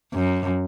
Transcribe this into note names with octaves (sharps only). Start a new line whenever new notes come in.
F#2